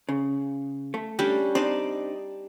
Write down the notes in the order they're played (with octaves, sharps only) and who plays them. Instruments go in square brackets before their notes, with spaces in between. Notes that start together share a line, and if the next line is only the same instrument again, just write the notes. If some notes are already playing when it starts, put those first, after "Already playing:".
[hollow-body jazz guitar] C#3
A3
[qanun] G3 C#4 D4
[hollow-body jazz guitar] C4 D4 D#4 [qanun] D5